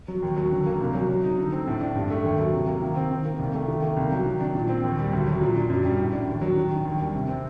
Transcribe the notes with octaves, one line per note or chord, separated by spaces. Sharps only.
F#3
D#2
F#3
D3
A#3
C2
F#3
F#3
D#4
D3
C4
A2
D4
G2
A3
D#2
F#3
C3
A#3
D#3
C4
D#3
A#3
C2
A3
D#3
A#3
C2
F#3
D#3
D4
A#2
C4
D#2
G3
D2
F#3
A#2
D4
F#2
G3
A2
D4
D#2
F#3
D#3
D4
D#2
G3
C3
C4